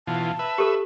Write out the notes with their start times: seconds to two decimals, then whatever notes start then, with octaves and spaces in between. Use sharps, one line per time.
0.08 B2 E3 F4 A5
0.39 B4 E5
0.58 G4 A4